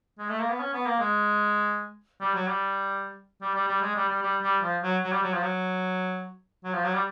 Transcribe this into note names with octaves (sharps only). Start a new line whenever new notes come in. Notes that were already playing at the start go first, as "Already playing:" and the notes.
G#3
A3
A#3
B3
C#4
B3
A#3
G#3
G3
F#3
G3
G3
G3
G3
G#3
G3
G3
G3
G3
F3
F#3
F#3
G3
F#3
F3
F#3
F#3
F3
F#3
G3